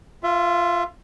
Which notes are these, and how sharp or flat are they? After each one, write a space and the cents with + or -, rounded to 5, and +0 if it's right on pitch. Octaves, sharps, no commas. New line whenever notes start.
F4 +0 E5 +30